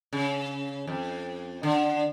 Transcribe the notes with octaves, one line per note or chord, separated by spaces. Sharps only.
C#3
F2
D3